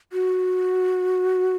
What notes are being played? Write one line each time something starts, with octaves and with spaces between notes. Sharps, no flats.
F#4